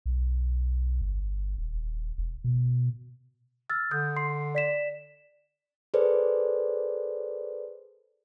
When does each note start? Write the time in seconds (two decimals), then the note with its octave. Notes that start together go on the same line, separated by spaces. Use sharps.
0.06 B1
1.02 G1
1.58 D#1
2.18 E1
2.44 B2
3.70 E6 F6 A6
3.91 D3 D#6 G6
4.17 C6 C7
4.55 D5 B6 E7
5.94 G#4 A4 B4 C5 D5